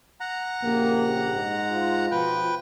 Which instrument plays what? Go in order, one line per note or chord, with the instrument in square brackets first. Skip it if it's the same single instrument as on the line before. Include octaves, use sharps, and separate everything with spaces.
[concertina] F#5 A#5
[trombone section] A#1 C#3 G4 [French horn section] A#3
[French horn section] G#2
[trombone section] F4
[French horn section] B2 F3 [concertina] B4 G5